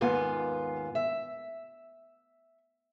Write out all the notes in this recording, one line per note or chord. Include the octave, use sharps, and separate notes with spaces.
D#2 G#2 B3 F4 G#5
E5